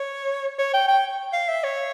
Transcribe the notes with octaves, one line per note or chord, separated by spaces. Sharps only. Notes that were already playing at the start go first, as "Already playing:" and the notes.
Already playing: C#5
C#5
G5
G5
F5
E5
C#5